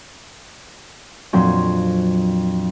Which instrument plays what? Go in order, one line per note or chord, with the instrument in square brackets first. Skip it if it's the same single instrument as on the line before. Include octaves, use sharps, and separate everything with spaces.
[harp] F2 A#2 F#3 C4 D4